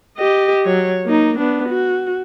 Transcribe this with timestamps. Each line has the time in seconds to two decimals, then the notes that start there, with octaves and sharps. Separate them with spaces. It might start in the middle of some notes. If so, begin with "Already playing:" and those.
0.17 G4 D#5
0.64 F#3 C#5
1.06 A#3 D#4
1.38 B3 D4
1.69 F#4